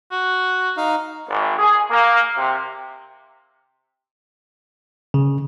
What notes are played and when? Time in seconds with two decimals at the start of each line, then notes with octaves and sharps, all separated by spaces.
0.11 F#4
0.77 D#4 F5
1.30 G#1
1.59 G#4
1.90 A#3
2.38 C3
5.14 C#3